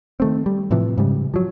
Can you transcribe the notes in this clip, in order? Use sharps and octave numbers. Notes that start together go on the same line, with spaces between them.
D#3 A3 C4
G3
A2 C3 E3 F3
G#2 C#3 G3
F3 F#3